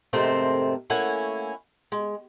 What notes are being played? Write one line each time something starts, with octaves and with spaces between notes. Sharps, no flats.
F2 G#2 C3 A3 C4 A#4
A3 A#3 C#4 E4 F#5 G#5
G#3